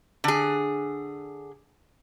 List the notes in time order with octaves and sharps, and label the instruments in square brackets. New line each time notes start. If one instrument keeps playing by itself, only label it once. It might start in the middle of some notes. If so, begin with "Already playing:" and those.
[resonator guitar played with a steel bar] D3 G#4